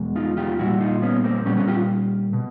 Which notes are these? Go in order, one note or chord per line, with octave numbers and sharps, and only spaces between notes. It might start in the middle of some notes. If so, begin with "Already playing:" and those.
Already playing: E2 B2 G#3
D#4 F4
F4 G4
A#2 G3 E4 F#4
D#4 F4
B3 C#4
A#3 C4
A#2 G3 B3 C#4
B3 C#4
F4 G4
B2